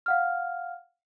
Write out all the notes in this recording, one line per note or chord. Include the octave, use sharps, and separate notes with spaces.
F5 F#5 F6